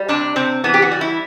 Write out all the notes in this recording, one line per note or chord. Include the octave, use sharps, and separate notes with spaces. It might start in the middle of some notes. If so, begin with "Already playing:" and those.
Already playing: G3
C3 D4
C3 C4
E3 B3
G4
F#4
G3
E4